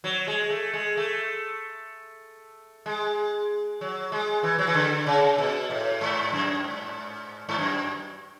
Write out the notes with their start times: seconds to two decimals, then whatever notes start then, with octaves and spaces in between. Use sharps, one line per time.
0.04 F#3
0.28 G#3
0.50 A3
0.73 G#3
0.97 A3
2.86 G#3
3.81 F#3
4.12 G#3
4.43 E3
4.59 F#3
4.67 E3
4.74 D3
5.06 C#3
5.38 B2
5.70 A2
6.01 G#2
6.33 F#2
6.64 G#2
7.49 G#2
7.59 F#2